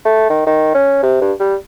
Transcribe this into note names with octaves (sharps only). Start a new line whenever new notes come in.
A3
D#3
D#3
C#4
C3
G2
G3